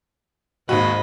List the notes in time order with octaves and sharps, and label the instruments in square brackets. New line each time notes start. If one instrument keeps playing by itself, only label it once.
[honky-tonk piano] G#1 D#2 F#4 [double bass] G#2 [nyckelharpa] D#5 B5